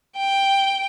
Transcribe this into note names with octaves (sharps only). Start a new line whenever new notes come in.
G5